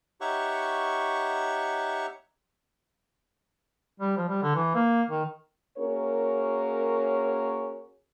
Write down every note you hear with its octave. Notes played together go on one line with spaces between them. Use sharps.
D#4 G4 C#5 E5 F#5 C#6
G3
F3
G3
D3
E3
A#3
D#3
A#3 C#4 F#4 G#4 A#4 C#5